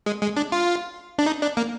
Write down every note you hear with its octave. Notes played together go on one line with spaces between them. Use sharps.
G#3
G#3
D4
F4
D4
D#4
D4
A#3